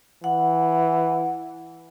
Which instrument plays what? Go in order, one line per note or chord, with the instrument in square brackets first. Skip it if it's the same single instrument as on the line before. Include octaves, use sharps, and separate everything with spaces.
[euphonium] E3 [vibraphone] F#5